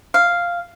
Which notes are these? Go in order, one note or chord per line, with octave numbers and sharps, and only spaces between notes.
F5